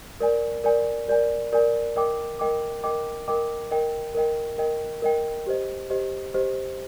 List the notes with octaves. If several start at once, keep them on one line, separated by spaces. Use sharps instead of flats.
A#4 D5 G#5
A#4 D5 G#5
A#4 D5 G#5
A#4 D5 G#5
A#4 D#5 G5 D6
A#4 D#5 G5 D6
A#4 D#5 G5 D6
A#4 D#5 G5 D6
A#4 D#5 G5
A#4 D#5 G5
A#4 D#5 G5
A#4 D#5 G5
G4 C5 D#5
G4 C5 D#5
G4 C5 D#5